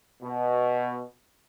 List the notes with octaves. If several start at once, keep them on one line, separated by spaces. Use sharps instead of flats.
B2